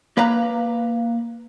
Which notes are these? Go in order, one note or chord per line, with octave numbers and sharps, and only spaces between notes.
A#3 B4 F5 A#5